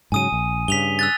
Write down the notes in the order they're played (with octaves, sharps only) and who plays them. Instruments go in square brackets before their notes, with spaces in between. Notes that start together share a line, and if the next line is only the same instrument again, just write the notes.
[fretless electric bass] G#2 C#3 F#3 [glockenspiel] G#5 D#6 D#7
[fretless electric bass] A#1
[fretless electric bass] G2 C#3 [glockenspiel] B6 F7 G7
[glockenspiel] E6 F#6 A6